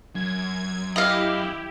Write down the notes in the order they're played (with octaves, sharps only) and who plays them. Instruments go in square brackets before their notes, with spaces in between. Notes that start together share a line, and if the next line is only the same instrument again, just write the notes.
[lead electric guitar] F#2 [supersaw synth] G#6
[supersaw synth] E4 G4 [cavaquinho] D#5 F5